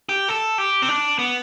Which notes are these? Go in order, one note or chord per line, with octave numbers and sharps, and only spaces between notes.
G4
A4
G4
C4
D4
B3